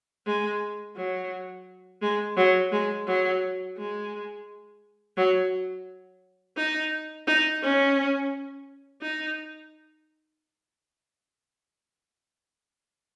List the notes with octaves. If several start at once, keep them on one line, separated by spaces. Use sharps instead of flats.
G#3
F#3
G#3
F#3
G#3
F#3
G#3
F#3
D#4
D#4
C#4
D#4